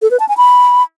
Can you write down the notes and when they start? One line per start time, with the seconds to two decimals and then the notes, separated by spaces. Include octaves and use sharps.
0.02 A4
0.11 B4
0.20 A5
0.28 G#5
0.37 B5